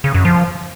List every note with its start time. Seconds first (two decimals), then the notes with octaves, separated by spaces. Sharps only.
0.04 C#3
0.14 F#2
0.25 F3